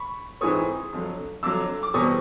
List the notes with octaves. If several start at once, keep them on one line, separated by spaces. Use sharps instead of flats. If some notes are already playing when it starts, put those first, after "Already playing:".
Already playing: B5 C#6
G#2 E3 G#3 C4 C#6 D#6
F2 D3 F#3
F2 D3 F#3 D6 E6
D6
E2 B2 G3 C4 C#6 D#6